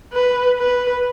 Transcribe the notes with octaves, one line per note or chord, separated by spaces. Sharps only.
B4
B4